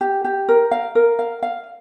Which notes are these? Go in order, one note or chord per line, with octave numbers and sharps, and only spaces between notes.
G4
G4
A#4
F5
A#4
F5
F5